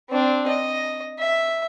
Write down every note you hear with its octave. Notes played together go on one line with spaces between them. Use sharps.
C4 D4
D#5
E5